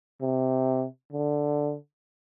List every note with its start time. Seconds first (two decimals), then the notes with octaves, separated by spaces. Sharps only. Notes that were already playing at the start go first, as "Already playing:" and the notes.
0.21 C3
1.12 D3